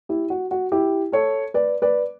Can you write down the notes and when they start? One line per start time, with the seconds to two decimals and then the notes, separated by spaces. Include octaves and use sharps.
0.09 E4 G4
0.30 F#4
0.51 F#4
0.72 E4 G4
1.12 A4 C#5
1.54 B4 D5
1.82 B4 D5